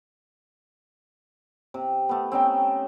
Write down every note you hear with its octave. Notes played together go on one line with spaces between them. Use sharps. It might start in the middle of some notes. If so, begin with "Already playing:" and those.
C3
A3 B3
C4 C#4 D#4 G5